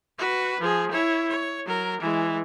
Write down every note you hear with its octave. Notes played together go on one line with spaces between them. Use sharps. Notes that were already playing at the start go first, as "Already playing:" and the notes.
F#4 B4
F3 G#4
E4 C#5
C#5
F#3 A#4
E3 G#3